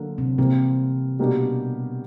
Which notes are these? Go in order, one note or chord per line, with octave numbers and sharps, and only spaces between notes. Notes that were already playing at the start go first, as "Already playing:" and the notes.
Already playing: D3 F#3 A#3
C3 C4
C3 E3 G3 A#3 C4
B2 G3 A#3 D4 G4